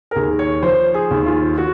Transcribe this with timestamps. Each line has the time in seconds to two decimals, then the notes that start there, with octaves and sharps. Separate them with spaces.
0.11 A#4
0.16 D#2 G#4
0.39 C#5
0.63 F3 C5
0.94 G#4
1.11 D#2
1.26 F4
1.58 F#4